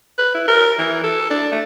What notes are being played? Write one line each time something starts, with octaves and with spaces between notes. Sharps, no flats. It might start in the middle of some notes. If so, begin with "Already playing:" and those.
B4
E4
A#4
E3
A4
D4
A3